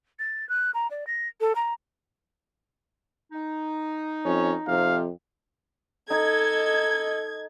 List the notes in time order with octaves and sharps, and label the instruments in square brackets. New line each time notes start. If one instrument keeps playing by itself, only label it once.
[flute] A6
F#6
A#5
D5
A#6
A4
A#5
[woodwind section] D#4
[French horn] F2 [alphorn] C#4
[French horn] F2 [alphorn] C3 [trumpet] F5
[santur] D#4 [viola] A4 D#5 [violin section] G#6